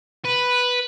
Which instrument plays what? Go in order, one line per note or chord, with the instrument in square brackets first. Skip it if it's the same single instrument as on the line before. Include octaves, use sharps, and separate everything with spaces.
[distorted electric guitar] B4